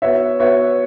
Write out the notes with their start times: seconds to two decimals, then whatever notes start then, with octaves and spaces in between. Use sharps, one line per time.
0.02 B3 F#4 C#5 E5
0.39 B3 F#4 C#5 E5